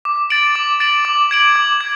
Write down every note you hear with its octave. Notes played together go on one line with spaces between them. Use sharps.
D6
A6 D7 F#7
D6
A6 D7 F#7
D6
G#6 D7 F#7
D6
G#6